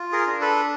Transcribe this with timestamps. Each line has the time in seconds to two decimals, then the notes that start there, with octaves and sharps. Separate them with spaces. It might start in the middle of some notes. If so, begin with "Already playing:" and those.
Already playing: F4
0.12 G#4 A#4
0.27 D4
0.41 A4 B4